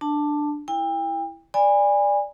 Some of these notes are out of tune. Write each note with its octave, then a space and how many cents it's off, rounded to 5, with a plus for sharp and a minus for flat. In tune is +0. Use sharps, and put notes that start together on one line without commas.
D4 +10 A5 +5
E4 +0 G5 +35
D5 +0 G#5 -30 B5 +0